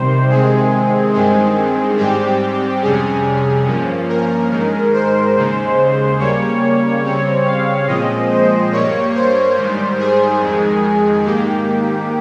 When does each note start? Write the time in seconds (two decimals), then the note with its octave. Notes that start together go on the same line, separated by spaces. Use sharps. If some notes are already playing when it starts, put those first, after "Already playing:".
Already playing: C3 D#3 G3 C5
0.29 C3 D#3 G#3 C4 G#4
1.14 G2 D#3 G#3 C4
1.97 G#2 G3 C4 G4
2.82 F2 C3 G3 C#4 G#4
3.66 G2 F3 A#3 C#4
4.09 A#4
4.51 G#2 D#3 G#3
4.93 C5
5.35 D#2 C#3 G#3
6.19 C#3 G3 A#3 C#5
7.03 C#3 G3 C4
7.45 F5
7.87 A#2 F3 G#3 C4 D#5
8.30 C5
8.72 G2 G3 A#3 C#5
9.14 C5
9.56 G#2 D#3 G3
9.99 G#4
10.40 F2 D#3 G#3
11.25 G#2 D#3 A#3 G4